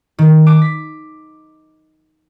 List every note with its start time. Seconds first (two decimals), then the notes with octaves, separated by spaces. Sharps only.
0.18 D#3
0.47 D6
0.62 B6